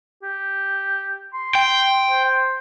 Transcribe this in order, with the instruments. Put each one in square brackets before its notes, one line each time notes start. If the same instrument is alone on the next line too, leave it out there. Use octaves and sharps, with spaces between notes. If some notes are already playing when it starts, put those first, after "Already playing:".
[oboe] G4
C6
[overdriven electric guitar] G5
[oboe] C5